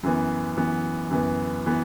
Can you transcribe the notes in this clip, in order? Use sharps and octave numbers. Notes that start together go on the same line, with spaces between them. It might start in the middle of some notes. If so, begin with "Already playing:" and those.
F#2 E3 B3
F#2 E3 B3
F#2 E3 B3
E3 B3